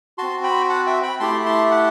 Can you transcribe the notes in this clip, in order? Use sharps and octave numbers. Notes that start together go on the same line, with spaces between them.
C4 F#4 A5 C6
G5 B5
F#5 A5
E5 G5
G5 B5
A3 E4 G4 A5 C6
A5 C6
F#5 A5